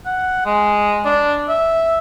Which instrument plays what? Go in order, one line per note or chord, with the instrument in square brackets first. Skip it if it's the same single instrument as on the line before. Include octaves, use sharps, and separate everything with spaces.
[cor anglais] F#5
G#3
D4
E5